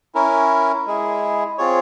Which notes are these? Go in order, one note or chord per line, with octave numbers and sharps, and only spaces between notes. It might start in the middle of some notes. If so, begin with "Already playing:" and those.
C#4 E4 A#4
G#3 E4 G#4
C4 F4 G#4 C#5